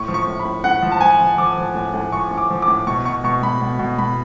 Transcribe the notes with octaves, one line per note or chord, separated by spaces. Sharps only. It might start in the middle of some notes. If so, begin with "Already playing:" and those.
Already playing: A2 C#6
F3
C#6
A2
B5
A2
A2 F#5
F3
A5
F3 G#5
F3
F3 D6
F3
A2
A2
F3 C#6
A2
D6
F3
D6
A2
B2 C#6
B2 C#6
B2 C#6
B2 B5
B2
B2
B2 B5